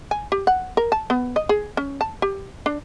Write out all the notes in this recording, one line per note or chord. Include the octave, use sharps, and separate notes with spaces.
G#5
G4
F#5
A#4
A5
B3
D#5
G#4
C#4
A5
G4
D4